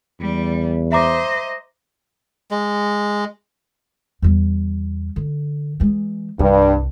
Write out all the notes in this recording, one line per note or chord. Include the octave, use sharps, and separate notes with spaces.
E2 G3
C5 D#5 E5 A#5 D6
G#3
E2 G3
D3
E3 G#3
C2 G2